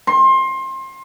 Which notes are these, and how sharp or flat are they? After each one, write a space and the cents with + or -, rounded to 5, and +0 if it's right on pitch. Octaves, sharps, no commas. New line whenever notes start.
C6 +25